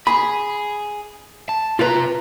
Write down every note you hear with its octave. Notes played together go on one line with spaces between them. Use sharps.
G#4 B5
A5
C3 F4 B4 F5 A#5